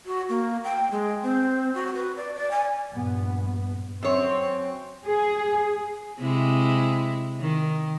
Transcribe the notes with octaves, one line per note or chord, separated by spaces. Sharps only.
F#4
A#3
G5
G#3
C4
F#4
B4
D5
D5
G#5
A#1 G2 B3
F#2 C4 C#5
G#4
C3 G#3 E4
D#3